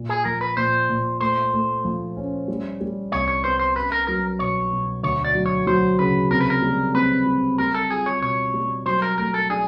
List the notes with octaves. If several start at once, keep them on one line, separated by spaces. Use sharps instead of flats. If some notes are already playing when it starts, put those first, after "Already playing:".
Already playing: A#2
G#4
F3 A#4
B4
A#2 C5
A#2
A3 C5
A3
F3
C#4
G3
G3
C2 C#5
C#5
B3 C5
C5
C#4 B4
A#4
F#3 A#4
B2 C#5
B2
D2 C#5
D5
F#3
C#5
F#3 C5
C#3 B4
C3 A#4
B4
A#4
G3
C4 B4
G3
G3 A#4
A4
F4 G#4
C#5
B2 C#5
G3
F#3 C5
A#4
A3 A#4
A4
D4 G#4